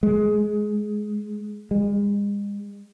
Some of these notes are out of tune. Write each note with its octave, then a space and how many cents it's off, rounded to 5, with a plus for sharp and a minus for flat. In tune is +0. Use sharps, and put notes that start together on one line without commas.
G#3 +15
G#3 -40